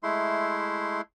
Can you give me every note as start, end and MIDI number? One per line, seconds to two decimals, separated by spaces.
0.03 1.01 56
0.03 1.01 57
0.03 1.01 64
0.03 1.01 84